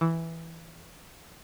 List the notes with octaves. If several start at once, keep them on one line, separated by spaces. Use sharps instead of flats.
E3